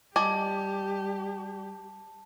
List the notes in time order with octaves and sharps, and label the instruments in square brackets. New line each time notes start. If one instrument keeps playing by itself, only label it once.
[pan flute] G3 [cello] G4 [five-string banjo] D5 D#5 G#5 [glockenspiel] A5